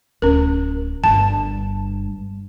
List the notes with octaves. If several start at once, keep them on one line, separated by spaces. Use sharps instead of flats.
D1 C#4 A#4
G1 G2 A5